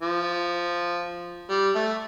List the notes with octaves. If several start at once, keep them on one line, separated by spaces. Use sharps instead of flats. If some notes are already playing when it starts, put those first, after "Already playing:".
F3
G3
A3